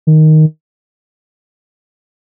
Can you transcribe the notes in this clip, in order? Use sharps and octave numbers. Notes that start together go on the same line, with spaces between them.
D#3